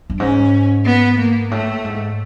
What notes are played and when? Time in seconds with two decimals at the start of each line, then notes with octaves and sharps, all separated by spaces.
0.10 G2
0.19 G#2 C#4
0.85 B3
1.19 A#3
1.51 A2 A3
1.84 G#2